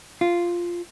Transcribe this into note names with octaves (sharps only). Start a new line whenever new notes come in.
F4